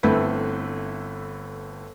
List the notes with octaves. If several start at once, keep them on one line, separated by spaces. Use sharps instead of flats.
G1 A3 C4 E4 B4